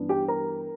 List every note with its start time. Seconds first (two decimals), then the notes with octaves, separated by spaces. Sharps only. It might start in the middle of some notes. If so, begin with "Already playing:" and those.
Already playing: G2 E3 B3 D4
0.09 G4 G5
0.28 A#4 A#5